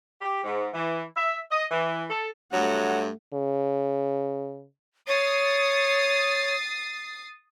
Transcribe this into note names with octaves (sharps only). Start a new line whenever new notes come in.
G4
G#2
E3
E5
D#5
E3
A4
G2 F#3 A3 F#5
C#3
C#5 D#6 A6 C7